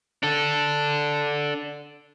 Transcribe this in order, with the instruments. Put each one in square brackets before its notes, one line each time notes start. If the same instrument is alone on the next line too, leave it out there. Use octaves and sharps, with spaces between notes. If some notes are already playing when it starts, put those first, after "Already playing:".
[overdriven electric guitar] D4 A4